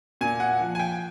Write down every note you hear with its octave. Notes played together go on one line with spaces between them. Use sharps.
A#2 G#5
F#5
F3
G#5
G5